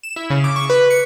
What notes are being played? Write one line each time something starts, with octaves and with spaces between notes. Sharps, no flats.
E7
E4
C#3
D6
C#6
B4
C#7